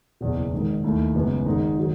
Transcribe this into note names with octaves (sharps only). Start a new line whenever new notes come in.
F#1 E2 B2
G#1 G#2 D#3
D#2 D#3 A3 E4
F#1 F#2 C#3 G#3 B3
G#1 G#2 D#3 G#3 D#4
D#3 F#3